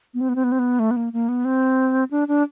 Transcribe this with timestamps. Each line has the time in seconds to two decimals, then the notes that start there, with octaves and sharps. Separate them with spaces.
0.14 B3
0.21 C4
0.29 B3
0.35 C4
0.44 B3
0.52 C4
0.59 B3
0.79 A3
0.91 B3
0.96 A#3
1.13 A#3
1.28 B3
1.45 C4
2.11 D4
2.28 D4